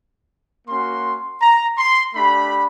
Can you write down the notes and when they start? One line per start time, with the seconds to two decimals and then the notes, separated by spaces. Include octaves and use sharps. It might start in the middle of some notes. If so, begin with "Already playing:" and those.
0.67 A#3 C#4 F#4 C6
1.41 A#5
1.78 C6
2.14 A3 D4 G4 B5